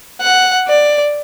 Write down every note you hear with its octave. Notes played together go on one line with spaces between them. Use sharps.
F#5
D5